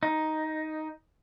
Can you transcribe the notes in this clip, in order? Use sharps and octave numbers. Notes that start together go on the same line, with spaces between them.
D#4